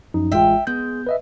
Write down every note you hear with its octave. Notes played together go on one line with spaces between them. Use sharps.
F#2 F3 D#4
A1 G#3 F4 E5 G5
G#3 B3 G6
B4 D#5 E5